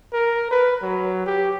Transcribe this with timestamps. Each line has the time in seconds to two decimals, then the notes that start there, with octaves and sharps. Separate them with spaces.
0.13 A#4
0.51 B4
0.83 F#3
1.26 G4